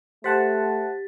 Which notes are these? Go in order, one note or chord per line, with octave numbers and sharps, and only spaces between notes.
A3 G4 C5 F#5 A5 A6 B6